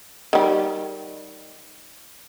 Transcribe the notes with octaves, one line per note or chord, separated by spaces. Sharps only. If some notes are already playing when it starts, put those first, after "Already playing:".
D#3 G3